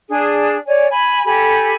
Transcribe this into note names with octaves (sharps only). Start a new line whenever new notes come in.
D4 G#4
C#5 D5 G#5
G#5 B5
G4 A4 G#5 B5